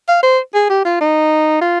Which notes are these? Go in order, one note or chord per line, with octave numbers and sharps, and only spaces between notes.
F5
C5
G#4
G4
F4
D#4
F4